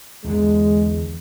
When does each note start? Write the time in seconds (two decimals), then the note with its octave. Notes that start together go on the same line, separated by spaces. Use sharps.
0.24 E2 D3 G#3